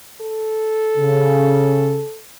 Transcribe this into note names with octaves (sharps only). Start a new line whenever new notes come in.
A4
C#3